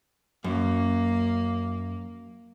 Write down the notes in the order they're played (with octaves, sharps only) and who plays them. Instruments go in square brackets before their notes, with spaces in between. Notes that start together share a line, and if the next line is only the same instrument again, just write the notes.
[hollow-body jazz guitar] F#2 [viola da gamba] A#3